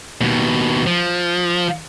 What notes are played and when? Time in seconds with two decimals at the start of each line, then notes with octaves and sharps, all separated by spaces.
0.21 D#2 B2
0.87 F3